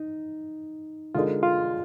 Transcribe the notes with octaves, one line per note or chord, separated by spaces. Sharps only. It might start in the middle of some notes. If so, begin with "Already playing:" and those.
Already playing: D#4
D3 G#3 D#4 F4 A#4
F4